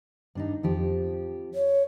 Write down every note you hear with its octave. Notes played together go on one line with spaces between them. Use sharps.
G2 D4 D#4
F2 F3 G4
C#5